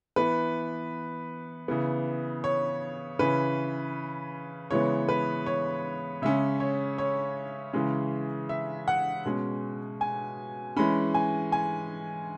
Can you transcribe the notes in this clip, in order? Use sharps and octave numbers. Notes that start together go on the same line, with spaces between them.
E3 B3 B4
C#3 E3 B3
C#5
C#3 E3 C#4 B4
C#3 E3 G#3 B3 C#5
B4
C#5
C#3 G#3 C#4 E5
C#5
C#5
C#3 E3 G#3 C#4
E5
F#5
B2 G#3 C#4
G#5
E3 G#3 C#4 B5
G#5
G#5